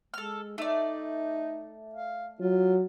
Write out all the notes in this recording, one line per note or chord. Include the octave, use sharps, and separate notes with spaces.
G#3 A4 F6
A3 D#4 D5
F5
F#3 F4